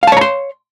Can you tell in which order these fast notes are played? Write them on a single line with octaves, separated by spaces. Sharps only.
F5 A5 C#5 A#5 C6